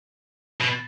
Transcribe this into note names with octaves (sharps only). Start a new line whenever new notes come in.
B2